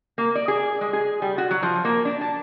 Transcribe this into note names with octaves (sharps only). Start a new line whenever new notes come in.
A#3
D5
G#4
G#3
G#4
G3
F#4
F#3
F3
A#3
D4
A5